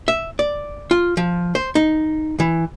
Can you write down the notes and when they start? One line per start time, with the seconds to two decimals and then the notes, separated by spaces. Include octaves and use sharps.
0.08 E5
0.39 D5
0.91 F4
1.17 F3
1.55 C5
1.75 D#4
2.40 E3